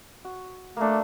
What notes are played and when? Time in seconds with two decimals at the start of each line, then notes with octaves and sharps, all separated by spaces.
0.25 F#4
0.77 A3 A#3 D4